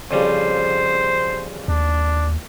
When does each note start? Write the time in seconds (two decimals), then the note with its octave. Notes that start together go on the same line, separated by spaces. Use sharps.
0.11 F2 C#3 G3 C5
1.68 D#2 D4